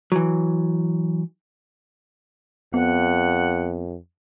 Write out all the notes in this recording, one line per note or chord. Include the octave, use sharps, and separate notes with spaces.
E3 F#3
F2 B3 F#5